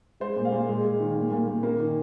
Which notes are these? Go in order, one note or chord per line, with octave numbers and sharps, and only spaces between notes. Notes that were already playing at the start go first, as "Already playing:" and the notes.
G#3 C5
A#2
F5
A#2
G#3
G#3
D#3
A#2
A#2
A#2
A#3
D#3